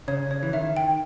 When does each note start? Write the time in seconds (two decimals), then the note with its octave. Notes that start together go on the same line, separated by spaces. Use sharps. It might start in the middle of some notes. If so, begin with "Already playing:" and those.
0.08 C#3 C#5
0.31 C#5
0.43 E3
0.53 D#3 E5
0.77 G5